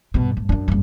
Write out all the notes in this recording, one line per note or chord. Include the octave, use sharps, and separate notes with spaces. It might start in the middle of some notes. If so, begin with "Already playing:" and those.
G2 B2
G2
F#2 D4
F#1 G2